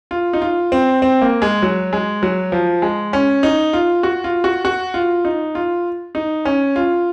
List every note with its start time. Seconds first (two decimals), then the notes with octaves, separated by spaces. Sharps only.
0.11 F4
0.33 D#4
0.42 F4
0.72 C4
1.02 C4
1.22 A#3
1.42 G#3
1.63 F#3
1.93 G#3
2.23 F#3
2.52 F3
2.82 G#3
3.13 C#4
3.43 D#4
3.73 F4
4.03 F#4
4.24 F4
4.44 F#4
4.65 F#4
4.94 F4
5.25 D#4
5.55 F4
6.15 D#4
6.45 C#4
6.76 F4